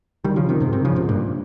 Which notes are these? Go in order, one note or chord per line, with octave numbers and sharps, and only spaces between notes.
D#3 G3
C#3 F3
C3 D#3
G#2 C3
C3 D#3
C#3 F3
G#2 C3
G2 A#2